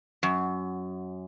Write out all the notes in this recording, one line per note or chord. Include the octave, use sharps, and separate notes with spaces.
F#2